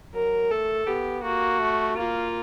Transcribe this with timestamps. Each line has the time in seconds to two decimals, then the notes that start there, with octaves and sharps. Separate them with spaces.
0.14 F#3 A#4
0.51 A3 A4
0.87 B3 G4
1.23 A#3 F#4
1.61 A3
1.96 A#3 F4